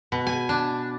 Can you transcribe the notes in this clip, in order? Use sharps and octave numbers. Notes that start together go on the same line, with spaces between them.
B2
G#5
D4